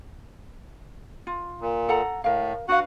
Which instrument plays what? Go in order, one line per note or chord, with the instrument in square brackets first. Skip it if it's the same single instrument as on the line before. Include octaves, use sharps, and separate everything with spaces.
[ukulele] F4
[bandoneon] A#2
[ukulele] A4 F#5 A#5
[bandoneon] A2 [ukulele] A#4 F5
[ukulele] D4 B4 F5 [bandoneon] F#4 F#5